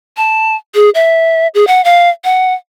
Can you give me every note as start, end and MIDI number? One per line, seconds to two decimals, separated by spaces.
0.17 0.56 81
0.75 0.90 68
0.95 1.47 76
1.55 1.67 68
1.67 1.83 78
1.85 2.09 77
2.24 2.53 78